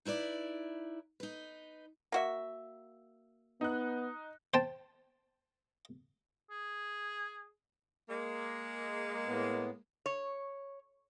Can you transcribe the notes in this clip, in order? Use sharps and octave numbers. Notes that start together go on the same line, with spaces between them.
D#4 E4 B4 D5
D#4 B4
A#3 F#4 E5
B3 D#4 F#6
C5 G5 A5
G#4
G#3 A#3
A2 B3
C#5